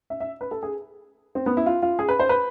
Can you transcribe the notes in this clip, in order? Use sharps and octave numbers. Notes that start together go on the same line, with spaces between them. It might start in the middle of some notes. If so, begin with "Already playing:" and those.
E5
E5
B4
A4
G#4
C4
B3
E4
F4
F4
G#4
B4
C5
B4